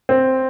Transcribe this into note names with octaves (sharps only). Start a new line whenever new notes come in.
C4